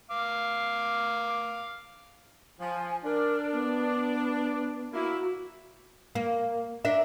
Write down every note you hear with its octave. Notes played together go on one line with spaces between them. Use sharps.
F5 D6
F3 G#5
D4 A#4
B3
A#3 E4 F#4
A#3
D4 A#4 E5